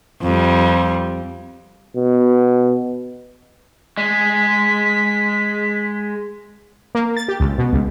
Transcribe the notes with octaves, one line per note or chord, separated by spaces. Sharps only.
F2 G3
B2
G#3 B6
A#3
A6
G4
C#2
B2
C#2